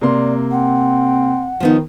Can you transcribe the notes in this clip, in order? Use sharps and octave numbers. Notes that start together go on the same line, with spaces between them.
C3 A#3 D5 C6
C4 F#5
D#3 F3 B3 D#4